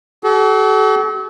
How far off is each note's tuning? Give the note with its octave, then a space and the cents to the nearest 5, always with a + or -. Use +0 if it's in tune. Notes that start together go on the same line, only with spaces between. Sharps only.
F#4 +45 A4 -40